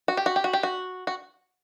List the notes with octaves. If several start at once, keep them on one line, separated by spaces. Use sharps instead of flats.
F#4
G4
F#4
G4
F#4
G4
F#4
F#4